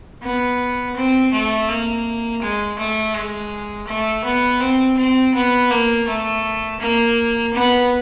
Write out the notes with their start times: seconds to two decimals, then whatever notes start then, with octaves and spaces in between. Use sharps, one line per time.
0.23 B3
0.96 C4
1.33 A3
1.69 A#3
2.42 G#3
2.79 A3
3.15 G#3
3.88 A3
4.25 B3
4.61 C4
4.97 C4
5.35 B3
5.71 A#3
6.08 A3
6.80 A#3
7.54 B3